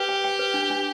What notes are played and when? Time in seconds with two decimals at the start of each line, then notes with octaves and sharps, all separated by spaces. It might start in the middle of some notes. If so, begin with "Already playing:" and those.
Already playing: G4 B4
0.09 G5
0.24 G5
0.39 B4
0.54 D4
0.70 D4